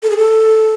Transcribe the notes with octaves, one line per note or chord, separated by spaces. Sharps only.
A4
G#4
A4